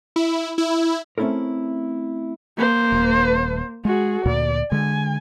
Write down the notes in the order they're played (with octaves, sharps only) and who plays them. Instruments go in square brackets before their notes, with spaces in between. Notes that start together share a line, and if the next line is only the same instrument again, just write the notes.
[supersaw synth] E4
E4
[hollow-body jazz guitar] A3 C4 C#4 E4 A4 A#4
[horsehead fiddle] A#3 C5
[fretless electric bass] D#1
[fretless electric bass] G#3 [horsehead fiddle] F#4 G#4
[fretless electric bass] D2 A#2 [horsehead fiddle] D5
[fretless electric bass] D3 G#3 [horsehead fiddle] G#5